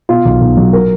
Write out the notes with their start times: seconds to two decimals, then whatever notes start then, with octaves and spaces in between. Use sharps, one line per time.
0.09 B2 F4
0.25 B1
0.40 B1
0.57 F#3
0.73 A#4